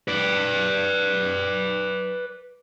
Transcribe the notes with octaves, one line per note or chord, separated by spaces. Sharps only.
B4 D5